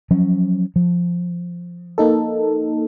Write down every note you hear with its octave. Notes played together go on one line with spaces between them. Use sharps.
F3 F#3 C#4
F3
A#3 D#4 A4